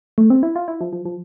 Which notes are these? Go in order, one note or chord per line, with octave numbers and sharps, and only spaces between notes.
A3
C4
E4
F4
E4
F3
F3
F3